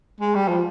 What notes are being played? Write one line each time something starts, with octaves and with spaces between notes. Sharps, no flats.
G#3
G3
F3